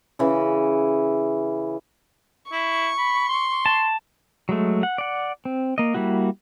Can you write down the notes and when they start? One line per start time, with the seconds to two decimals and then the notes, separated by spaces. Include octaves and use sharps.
0.19 C#3 E3
2.52 E4 C#6
2.97 B5
3.28 C6
3.66 A5
4.49 F#3 G#3 A3
4.83 F#5
4.98 D5 F#5
5.45 C4
5.78 A#3 D#5
5.94 G3 A#3 E4 F#4